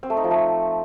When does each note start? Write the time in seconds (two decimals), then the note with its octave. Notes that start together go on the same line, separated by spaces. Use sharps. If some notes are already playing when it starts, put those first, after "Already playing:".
0.03 C4
0.10 A3
0.17 D#4
0.24 F3
0.31 A3